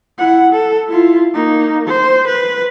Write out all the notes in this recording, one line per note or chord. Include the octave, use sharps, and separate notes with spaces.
E4 F#5
A4
E4 F4
A#3 D#4
C5
B4